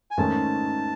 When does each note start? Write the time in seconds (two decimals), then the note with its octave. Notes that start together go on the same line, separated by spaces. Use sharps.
0.11 G#5
0.18 G#2 D#3 A3 C#4 A5